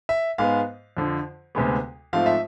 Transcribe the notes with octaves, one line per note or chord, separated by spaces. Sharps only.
E5
G#2 G#3 B3 F5
F2 D3 F3
D2 C3 G#3 B3
G#2 F3 A3 C4 F5
E5